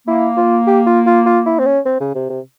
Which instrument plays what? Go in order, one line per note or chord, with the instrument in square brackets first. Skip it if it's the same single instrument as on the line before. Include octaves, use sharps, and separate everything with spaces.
[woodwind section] A#3 [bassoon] E4
[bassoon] F4
G4
F4
F4
F4
E4
C4
C#4
C4
C#3
C3
C3